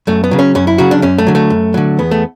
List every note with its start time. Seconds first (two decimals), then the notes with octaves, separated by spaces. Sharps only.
0.07 F#2 A3
0.24 B3
0.31 C#3 F#3
0.39 C#4
0.55 F#2 C#4
0.67 E4
0.78 C#3 F#3 F#4
0.91 D4
1.02 F#2 C#4
1.18 A3
1.27 D3 F#3
1.35 A3
1.50 F#2
1.74 D3 F#3
1.99 E2 B3
2.11 A3